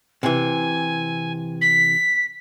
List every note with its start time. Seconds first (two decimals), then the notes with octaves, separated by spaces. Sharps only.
0.23 C3 E3 G#5
1.61 B6